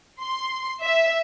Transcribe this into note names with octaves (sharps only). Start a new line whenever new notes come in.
C6
E5